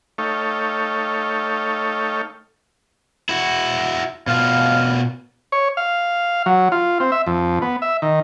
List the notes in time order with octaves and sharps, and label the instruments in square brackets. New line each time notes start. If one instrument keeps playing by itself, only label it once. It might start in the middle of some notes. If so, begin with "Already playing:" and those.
[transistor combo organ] A3 D#4 A4 C#5 F5 G5
[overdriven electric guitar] E4 F#4
[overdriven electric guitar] B2 F4 [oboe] F5
[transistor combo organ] C#5
F5
F#3
F4
C4
E5
F2
B3
E5
D#3